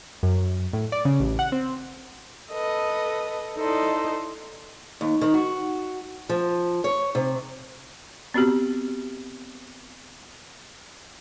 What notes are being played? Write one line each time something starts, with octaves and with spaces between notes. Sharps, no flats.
F#2
F#2
A2
D5
C#3
A1
F#5
C4
A4 B4 D#5 D#6
D#4 E4 A4 C5 D5 D#5
D#2
D#3
F#4
F3
C#5
C3
B3 C4 F#4 G4